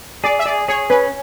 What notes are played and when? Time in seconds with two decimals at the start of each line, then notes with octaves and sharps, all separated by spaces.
0.24 G#4 D5
0.39 E5
0.45 G#4 D5
0.68 G#4 C#5
0.90 C#4 B4